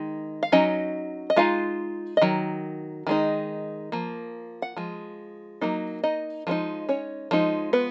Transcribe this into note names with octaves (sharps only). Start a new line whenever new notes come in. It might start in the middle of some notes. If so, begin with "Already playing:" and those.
Already playing: D#3 G#3 D#4
F5
F#3 C#4 D#4 D#5
D#5
G#3 D#4 F4 F5
D#5
D#3 F#3
D#3 G#3 D#4
F3 A#3
F#5
F3 G#3
F#3 A#3 D#4
D#4 D#5
F3 G#3 B3 D#4
C#4 C#5
F3 G#3 D#4
B3 B4